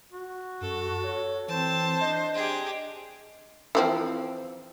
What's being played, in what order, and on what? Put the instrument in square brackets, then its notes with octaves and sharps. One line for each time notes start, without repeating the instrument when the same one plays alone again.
[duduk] F#4
[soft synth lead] F#2 [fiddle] A4
[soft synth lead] C#5
[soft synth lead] E3 [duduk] C4 [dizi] C5 [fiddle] A5
[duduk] D4 [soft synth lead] D#5
[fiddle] G4 G#4 [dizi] C6
[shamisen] E3 F3 C4